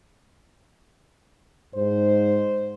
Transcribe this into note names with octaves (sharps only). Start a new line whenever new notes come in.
G#2 C5